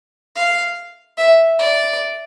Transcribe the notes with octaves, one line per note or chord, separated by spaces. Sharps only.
F5
E5
D5